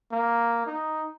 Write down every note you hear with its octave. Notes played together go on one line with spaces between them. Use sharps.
A#3
D#4